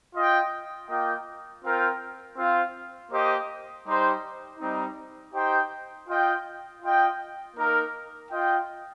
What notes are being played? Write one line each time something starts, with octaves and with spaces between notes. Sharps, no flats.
F4 D#5 G5
A#3 F4 D#5 G5
C4 F4 A#4 G5
C4 F4 C5 F5
A#3 G4 C5 D#5
G3 D#4 G4 C5
G3 C4 D#4
D#4 G4 C5 G5
F4 D#5 G5
F4 D#5 G5
A#3 D#4 A#4
F4 D#5 G5